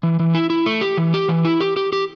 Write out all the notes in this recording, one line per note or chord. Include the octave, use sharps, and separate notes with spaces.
E3
E3
E4
E4
A3
G4
E3
G4
E3
E4
G4
G4
G4